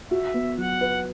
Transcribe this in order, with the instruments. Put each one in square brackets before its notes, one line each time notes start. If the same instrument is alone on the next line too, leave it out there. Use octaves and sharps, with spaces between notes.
[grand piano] F#4 [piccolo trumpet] E5
[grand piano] B3
[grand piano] F#3 [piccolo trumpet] F#5
[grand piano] B4